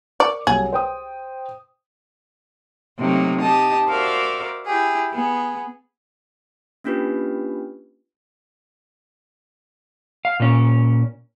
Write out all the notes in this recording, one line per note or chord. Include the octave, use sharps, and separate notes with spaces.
A#4 D5 C#6 D6
C2 F#3 G#4
C5 G5 D#6
C3 F#3 A3 A#3 D#4
D#4 G4 A5 D#6
F#4 A#4 C5 D5 E5 F5
E4 G4 G#4
B3 G#4
A#3 C#4 D4 F4 G4 B4
F5
A#2 C#4